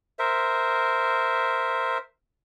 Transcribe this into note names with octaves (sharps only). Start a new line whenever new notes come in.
A#4 C5 E5